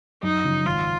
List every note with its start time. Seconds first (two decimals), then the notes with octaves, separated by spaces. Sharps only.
0.23 F#2 D#4
0.44 C#3 F3
0.65 G#1 F4